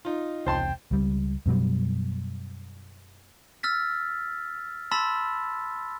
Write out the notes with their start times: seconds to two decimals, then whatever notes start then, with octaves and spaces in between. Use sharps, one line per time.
0.05 D#4 F4
0.46 E1 C2 C5 G5 A5 C6
0.91 C#2 G3
1.46 F#2 B2 F#3 G3
3.63 E6 F6 A6 B6
4.91 A5 B5 C6 E6 A6 B6